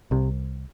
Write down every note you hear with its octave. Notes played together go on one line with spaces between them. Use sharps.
C2 C3